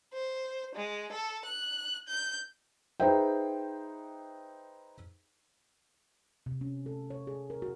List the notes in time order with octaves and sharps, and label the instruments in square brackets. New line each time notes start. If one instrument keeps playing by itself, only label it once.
[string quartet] C5
G#3
A4
F#6
G6
[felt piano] D#4 G#4 B4 C5 E5 G5
[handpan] C3
C#4
A4
C#5
G#4
A#4
F#4